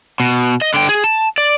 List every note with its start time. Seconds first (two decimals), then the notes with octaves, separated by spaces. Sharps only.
0.20 B2
0.61 D#5
0.74 D3 G5
0.89 G#4
1.04 A5
1.38 D5